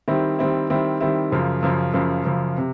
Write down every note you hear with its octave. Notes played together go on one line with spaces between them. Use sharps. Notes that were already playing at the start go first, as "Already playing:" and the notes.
D#3 G3 C4 E4
D#3 G3 C4 E4
D#3 G3 C4 E4
D#3 G3 C4 E4
F#2 C#3 F3
F#2 C#3 F3
F#2 C#3 F3
F#2 C#3 F3
C3